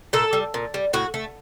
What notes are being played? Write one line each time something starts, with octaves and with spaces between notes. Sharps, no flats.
A#2 A4
G3
A#2
G3
A2 F#4
A3